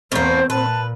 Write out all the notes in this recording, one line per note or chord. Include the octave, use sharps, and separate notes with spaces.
E2 A2 A#3 C4 C5
A#2 B4 A5